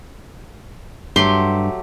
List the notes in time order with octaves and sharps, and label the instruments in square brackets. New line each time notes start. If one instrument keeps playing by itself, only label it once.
[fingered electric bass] G2 [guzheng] F#3 A3 G4 [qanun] C6